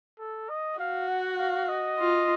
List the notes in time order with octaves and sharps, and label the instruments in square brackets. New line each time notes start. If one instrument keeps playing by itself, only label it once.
[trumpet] A4
D#5
[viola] F#4 [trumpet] F5
[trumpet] F#5
F5
D#5
[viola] F4